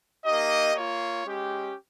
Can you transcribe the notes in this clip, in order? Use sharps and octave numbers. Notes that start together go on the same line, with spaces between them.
A#3 D#4 G4 D#5
A#3 F4 C#5
G#3 C#4 G4